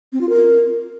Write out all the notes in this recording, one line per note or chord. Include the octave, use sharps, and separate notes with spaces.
C4
F4
A#4